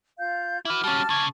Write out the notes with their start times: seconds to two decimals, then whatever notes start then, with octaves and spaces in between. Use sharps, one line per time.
0.18 F4 F5 G6
0.65 E4 F#4 B4 D6 F6
0.84 G3 C#4 A5
1.09 B1 C#3 D6 F6 G#6